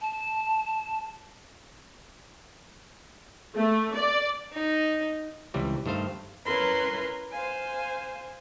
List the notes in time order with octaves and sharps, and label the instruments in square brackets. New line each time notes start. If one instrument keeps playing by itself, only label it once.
[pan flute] A5
[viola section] A3
D5
[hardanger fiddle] D#4
[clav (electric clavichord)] C#2 C3 E3 G3
G2 D#3 A3 C5 F5
[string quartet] C#4 E4 A#4 B4 B5 C6
C5 F5 G#5